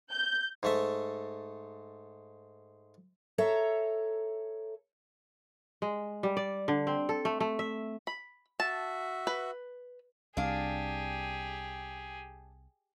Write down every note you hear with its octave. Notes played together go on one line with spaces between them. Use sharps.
G6
G#2 A3 E5
A4 C#5 E5 A#5
G#3
G3
D5
D3
C4
A4
A3
A3
E5
B5
F#4 E5 A5
B4
C2 D4 G4 G#4 F5